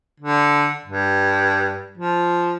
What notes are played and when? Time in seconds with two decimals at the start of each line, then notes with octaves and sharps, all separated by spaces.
0.20 D3
0.85 G2
1.98 F3